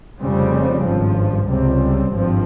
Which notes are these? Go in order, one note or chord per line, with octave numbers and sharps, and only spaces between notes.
F1 F2 C#3 G3 C4
G#1 G2 F3
C#2 C3 G3 C4
G#1 G2 F3 C4